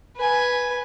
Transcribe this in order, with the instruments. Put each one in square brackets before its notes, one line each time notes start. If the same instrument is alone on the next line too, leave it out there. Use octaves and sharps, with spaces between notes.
[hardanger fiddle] B4 G#5